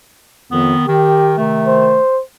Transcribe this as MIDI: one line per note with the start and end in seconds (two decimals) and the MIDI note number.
0.52 0.75 41
0.52 0.87 51
0.52 0.87 59
0.88 1.34 51
0.88 1.40 67
1.38 1.98 48
1.38 1.98 51
1.38 1.98 57
1.67 2.21 72